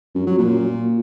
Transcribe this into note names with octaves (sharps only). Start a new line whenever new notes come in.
F#2
F#3
A#2